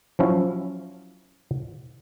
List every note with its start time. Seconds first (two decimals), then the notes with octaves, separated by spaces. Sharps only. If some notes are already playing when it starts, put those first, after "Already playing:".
0.19 F3 F#3 C#4 E4